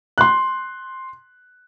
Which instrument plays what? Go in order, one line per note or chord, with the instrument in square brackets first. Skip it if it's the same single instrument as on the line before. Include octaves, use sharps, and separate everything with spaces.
[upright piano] C6 F#6